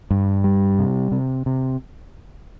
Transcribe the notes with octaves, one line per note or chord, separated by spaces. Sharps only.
G2
G3
C3
C3
C3